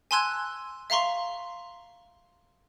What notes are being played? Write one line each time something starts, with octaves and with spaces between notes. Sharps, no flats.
G#5 A5 C6 E6 F#6 G#6
E5 F5 A#5 C6 C#6